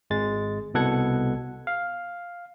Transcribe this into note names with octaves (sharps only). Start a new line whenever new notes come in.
G#1 G#3 A6
C2 B2 A4 F#5 G#6 C#7
F5